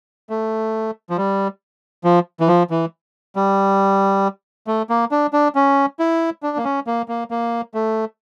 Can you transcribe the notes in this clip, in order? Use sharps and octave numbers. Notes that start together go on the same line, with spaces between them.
A3
F3
G3
F3
E3
F3
E3
G3
A3
A#3
D4
D4
C#4
E4
D4
A#3
C#4
A#3
A#3
A#3
A3